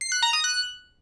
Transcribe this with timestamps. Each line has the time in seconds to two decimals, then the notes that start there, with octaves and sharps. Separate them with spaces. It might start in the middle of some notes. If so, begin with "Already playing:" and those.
0.01 C7
0.12 F#6
0.22 A#5
0.33 D#6
0.44 F#6